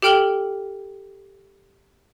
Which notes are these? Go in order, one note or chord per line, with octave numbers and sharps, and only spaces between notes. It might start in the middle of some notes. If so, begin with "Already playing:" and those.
G4 A4 G5 F6 F#7 G7